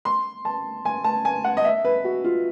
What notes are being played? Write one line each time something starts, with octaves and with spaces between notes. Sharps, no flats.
C6
A5
G#5
A5
G#5
F#5
D#5
E5
B4
F#4
F4